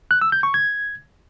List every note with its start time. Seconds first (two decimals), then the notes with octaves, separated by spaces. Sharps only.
0.11 F#6
0.22 E6
0.32 G6
0.43 C#6
0.54 G#6